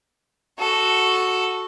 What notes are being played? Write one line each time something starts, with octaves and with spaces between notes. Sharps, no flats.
F#4 A4